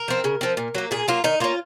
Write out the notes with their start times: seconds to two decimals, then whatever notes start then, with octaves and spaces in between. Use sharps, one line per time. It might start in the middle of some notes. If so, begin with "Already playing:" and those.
Already playing: A#4
0.08 F3 C4
0.24 C#3
0.41 F3 C4
0.57 A#2
0.75 F#3 A#3
0.91 A#2 G#4
1.08 F#3 A#3 F4
1.24 D#3 D#4
1.40 A#3 C#4 F4